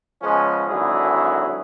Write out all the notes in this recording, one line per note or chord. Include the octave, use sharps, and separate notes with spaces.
C#3 F3 G#3 B3 C#4
G#1 D3 F#3 E4 G#4